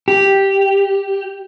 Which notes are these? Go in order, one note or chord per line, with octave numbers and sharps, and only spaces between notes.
G4